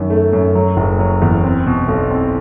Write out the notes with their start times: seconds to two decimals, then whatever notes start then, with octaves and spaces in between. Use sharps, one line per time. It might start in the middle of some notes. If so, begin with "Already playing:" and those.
Already playing: F#2 D#3
0.10 A3
0.33 F#2
0.55 F#3
0.77 F#1
0.99 F#3
1.22 E2
1.44 C4
1.66 B2
1.88 B1
2.11 C4